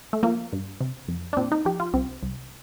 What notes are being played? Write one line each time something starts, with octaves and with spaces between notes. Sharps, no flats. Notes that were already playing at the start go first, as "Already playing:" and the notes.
A3
F3 A#3
G2
C3
F2
D4
A#2 C4
D#4
F3 G4
F4
C2 C4
C2